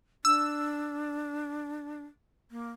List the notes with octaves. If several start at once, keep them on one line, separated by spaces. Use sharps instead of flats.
D4 E6
A#3